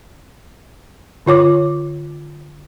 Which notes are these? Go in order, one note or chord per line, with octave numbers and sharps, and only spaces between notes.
D3 F4 C#5 D6